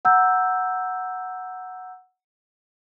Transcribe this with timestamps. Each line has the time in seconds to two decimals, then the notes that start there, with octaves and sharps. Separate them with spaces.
0.05 F#5 A#5 E6 G6